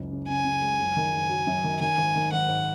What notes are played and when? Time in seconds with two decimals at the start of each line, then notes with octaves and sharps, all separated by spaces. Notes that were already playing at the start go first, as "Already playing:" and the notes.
Already playing: F#1 C#2 C#3
0.11 C#3
0.28 C#3 G#5
0.45 C#3
0.62 G#3
0.80 F#1
0.97 D#3
1.13 F#1
1.29 F#3
1.47 F#2
1.64 D#3
1.81 D#3 G#5
1.98 G#1
2.16 D#3
2.32 G#1 F#5
2.48 G#2